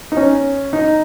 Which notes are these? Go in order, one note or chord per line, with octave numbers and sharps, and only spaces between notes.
D#4
C#4
D#4